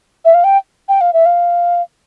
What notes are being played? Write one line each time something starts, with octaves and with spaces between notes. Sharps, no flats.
E5
F5
G5
G5
F5
E5
F5